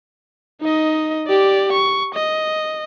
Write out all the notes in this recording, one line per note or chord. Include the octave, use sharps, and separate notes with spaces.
D#4 D#5
G4 D5
C#6
D#5